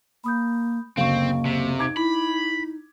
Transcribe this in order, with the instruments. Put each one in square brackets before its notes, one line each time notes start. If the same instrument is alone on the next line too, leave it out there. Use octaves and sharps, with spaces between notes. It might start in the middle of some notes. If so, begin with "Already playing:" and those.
[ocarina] A#3 [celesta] B5 D#6 G6
[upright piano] F#1 D2 [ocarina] A#3 [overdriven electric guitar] C4 [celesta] F5 C#6
[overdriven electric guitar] C3
[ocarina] D#4 [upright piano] D6 G#6 D7
[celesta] E4 [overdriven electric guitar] B5